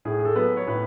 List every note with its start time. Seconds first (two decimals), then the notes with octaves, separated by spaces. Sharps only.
0.05 A2 G#4
0.19 G#4
0.25 A4
0.36 F#3 B3
0.57 C#5
0.67 A2 B4